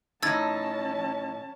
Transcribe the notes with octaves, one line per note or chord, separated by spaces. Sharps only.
A2 C#4 D#4 A5 E6 G#6 A6